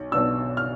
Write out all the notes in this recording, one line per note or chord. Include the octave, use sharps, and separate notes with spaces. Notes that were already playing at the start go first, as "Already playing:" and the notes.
Already playing: B1
B1 B2 B3 D4 E6
F6